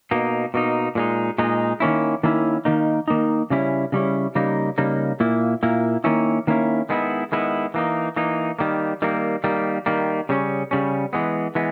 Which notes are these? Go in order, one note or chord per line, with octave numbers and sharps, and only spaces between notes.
B2 A#3 D#4
B2 A#3 D#4
A#2 G#3 D#4
A#2 G#3 D#4
D#3 A#3 C#4 E4
D#3 A#3 C#4 E4
D#3 A#3 D#4
D#3 A#3 D#4
C#3 G3 C#4 E4
C#3 G3 C#4 E4
C#3 G3 A#3 D#4
C#3 G3 A#3 D#4
A#2 A#3 E4
A#2 A#3 E4
D#3 A#3 C#4 E4
D#3 A#3 C#4 E4
D#3 G#3 B3 E4
D#3 G#3 B3 E4
E3 A#3 D#4
E3 A#3 D#4
D#3 G3 A#3
D#3 G3 A#3
D#3 G3 A#3
D#3 G3 A#3
C#3 G3 C#4
C#3 G3 C#4
E3 G#3 B3
E3 G#3 B3